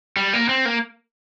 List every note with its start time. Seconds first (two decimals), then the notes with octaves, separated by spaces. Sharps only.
0.17 G3
0.33 A#3
0.49 C4
0.65 A#3